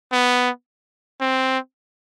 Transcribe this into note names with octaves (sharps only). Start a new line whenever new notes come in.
B3
C4